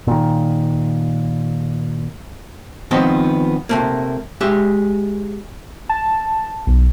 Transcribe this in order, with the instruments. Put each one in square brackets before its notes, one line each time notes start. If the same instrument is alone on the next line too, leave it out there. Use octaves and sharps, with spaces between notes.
[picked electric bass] A#2 D#3
[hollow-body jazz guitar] D#3 F3 B3 C4 D#5
C3 A3 A#3
G#3 G4 E5
[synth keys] A5
B1